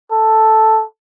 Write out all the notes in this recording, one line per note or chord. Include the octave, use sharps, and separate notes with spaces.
A4